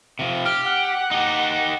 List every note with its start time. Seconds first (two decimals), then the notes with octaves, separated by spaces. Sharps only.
0.19 C3 F3
0.45 G4 F6
0.65 F#5
1.11 D#4 G4